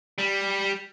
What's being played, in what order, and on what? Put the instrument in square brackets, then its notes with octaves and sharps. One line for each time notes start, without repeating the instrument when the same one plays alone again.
[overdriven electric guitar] G3